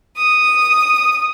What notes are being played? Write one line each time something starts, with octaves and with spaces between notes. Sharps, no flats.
D#6